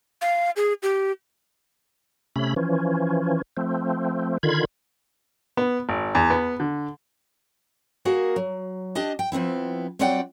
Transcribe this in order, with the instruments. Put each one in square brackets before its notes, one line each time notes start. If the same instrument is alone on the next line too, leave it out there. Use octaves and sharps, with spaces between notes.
[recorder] F5
G#4
G4
[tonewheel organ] C3 A3 C#4 B5
E3 F3 C#4
F3 A3 C4
D3 D#3 F4 B5 G#6
[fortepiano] B3
G#1
E2
B3
D3
[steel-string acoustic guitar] A#3 F#4 G#4 A#4
F#3
D4 G4 D#5 A5
G5
F3 B3 C4 E4
F#3 C4 F4 D5 F#5 G5